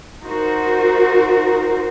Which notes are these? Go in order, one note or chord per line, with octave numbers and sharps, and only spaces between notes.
D#4 F#4 A#4 C5